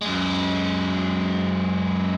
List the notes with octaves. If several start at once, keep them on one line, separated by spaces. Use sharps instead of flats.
F#2 G#3